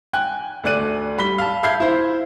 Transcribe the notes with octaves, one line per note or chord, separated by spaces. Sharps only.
G5 G#5 F#6
D2 A3 D5 F#6 D#7
G3 B5 B6 G7
F5 A5
E5 F5 B5 G6 G#6 C7
E4 C5